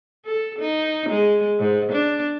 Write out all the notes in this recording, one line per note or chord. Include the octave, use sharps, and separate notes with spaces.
A4
D#4
G#3
G#2
D4